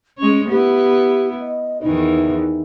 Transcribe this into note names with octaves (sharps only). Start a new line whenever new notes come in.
G#3 C#4 C#5
B3 E4 G4
D#5
E2 D#3 E3 D#4